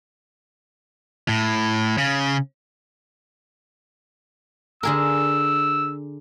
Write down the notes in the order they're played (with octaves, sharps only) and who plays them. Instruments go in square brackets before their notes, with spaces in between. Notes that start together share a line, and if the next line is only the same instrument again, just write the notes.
[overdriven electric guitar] A2
C#3
[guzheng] D3 G#4 A#4 [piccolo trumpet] E6